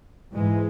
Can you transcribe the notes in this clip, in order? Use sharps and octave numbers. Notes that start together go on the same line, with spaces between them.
G#2 E3 G#3